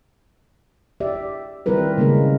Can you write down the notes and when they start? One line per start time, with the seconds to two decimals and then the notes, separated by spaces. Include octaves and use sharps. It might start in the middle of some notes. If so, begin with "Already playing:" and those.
1.00 G4 D5 E5
1.66 D#3 G3 C4 E4 A#4 B4
1.98 C#3 G#3 A#3 C#4 A#4